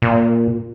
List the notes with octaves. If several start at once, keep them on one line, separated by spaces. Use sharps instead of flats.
A#2